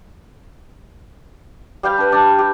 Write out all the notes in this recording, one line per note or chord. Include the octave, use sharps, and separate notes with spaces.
G3 F5 G5 B5
D4 B4
D4
G4